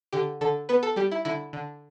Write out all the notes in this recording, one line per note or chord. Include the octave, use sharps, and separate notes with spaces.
D3 G4
D3 A4
B3 B4
A4
G3 G4
E4
D3 E4
D3